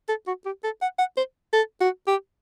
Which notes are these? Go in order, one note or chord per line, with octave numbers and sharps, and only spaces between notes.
A4
F#4
G4
A4
F#5
F#5
C5
A4
F#4
G4